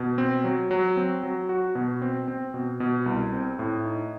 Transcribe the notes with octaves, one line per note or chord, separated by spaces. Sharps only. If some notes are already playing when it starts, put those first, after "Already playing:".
Already playing: B2
C4
F#3
F#3
C4
F#3
F#4
B2
C4
C4
B2
B2
C2
C4
A2
D#4